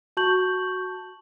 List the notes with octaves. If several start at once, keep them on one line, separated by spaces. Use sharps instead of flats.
F#4 A5 C#6 G6 F#7